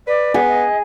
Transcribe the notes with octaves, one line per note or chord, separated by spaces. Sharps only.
B4 D5
B3 G#4
D#5